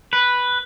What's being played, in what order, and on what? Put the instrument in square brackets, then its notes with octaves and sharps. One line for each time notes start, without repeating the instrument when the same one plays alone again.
[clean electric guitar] B4